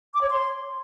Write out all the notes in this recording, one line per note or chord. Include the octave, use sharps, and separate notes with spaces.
D6
C#5
C6